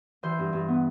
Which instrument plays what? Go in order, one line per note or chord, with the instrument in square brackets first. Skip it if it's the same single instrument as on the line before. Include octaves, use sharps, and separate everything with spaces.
[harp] E3 C5
G2
G2
B3